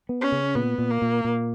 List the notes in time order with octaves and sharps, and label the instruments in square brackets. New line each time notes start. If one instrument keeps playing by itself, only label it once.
[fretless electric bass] B3
[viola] C#4
[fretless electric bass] C#3
[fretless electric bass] A#2 [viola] B3
[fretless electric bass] A#2
[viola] A#3
[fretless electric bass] A#2
A#2